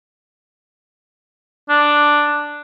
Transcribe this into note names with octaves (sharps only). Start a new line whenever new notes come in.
D4